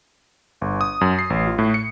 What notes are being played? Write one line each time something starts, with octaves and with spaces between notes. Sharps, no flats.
G1
D#6
F#2
C7
A1
F4
A2
C#7